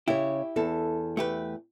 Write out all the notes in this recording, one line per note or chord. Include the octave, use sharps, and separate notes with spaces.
C#3 E4 G4 C#5
E2 A4 E5
A3 G4 B4